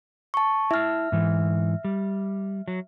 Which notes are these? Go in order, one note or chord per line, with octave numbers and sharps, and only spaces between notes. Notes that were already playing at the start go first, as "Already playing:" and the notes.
A5 C#6
E4 E5 A5 F6
G#2 E3
G3
F#3